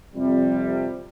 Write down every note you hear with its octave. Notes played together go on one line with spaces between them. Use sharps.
F2 C3 G3